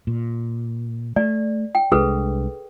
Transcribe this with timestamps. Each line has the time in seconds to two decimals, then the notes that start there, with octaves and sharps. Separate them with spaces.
0.07 A#2
1.16 A3 D5
1.75 G5
1.92 C2 G#3 D4 G#4 A4 B4